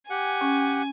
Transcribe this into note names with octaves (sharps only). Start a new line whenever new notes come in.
G4 F#5 G#5
C#4